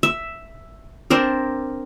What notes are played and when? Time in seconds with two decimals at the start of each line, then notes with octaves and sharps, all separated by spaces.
0.03 E5
1.10 C4 D4 A#4